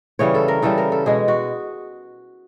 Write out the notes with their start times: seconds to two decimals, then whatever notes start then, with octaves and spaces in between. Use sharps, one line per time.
0.19 C#3 E3 G3 C#5
0.34 A4
0.48 A#4
0.62 C#3 E3 G3 A4
0.78 A#4
0.92 A4
1.06 B2 G#3 G#4
1.28 F#4